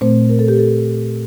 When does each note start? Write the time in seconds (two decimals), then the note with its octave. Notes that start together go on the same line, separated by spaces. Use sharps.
0.01 A#2 A3 C4 C5
0.29 A#4
0.39 A4
0.48 G4
0.58 A4